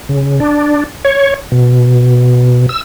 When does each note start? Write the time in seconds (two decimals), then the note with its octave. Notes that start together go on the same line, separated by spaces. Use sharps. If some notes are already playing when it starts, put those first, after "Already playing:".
0.09 C#3
0.40 D4
1.05 C#5
1.52 B2
2.69 E6